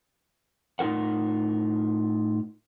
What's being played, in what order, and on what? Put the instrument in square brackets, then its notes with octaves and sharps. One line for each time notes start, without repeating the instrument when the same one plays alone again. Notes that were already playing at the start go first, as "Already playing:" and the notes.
[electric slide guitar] A2 D#4 F4 A#4 F#5